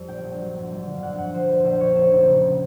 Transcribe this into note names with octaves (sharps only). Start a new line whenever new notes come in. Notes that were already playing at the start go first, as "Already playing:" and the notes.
Already playing: F2 G3
A#1 G5
A#1
F#3
G1
G1
D3
F5
F2 F#5
F2 F#5
F3 C5
A#1 B4
A#1 C5
F3 C#5
F1 C5
F1
C#3